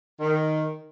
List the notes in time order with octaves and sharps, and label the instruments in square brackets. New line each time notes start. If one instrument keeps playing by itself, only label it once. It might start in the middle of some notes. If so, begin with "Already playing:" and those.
[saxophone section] D#3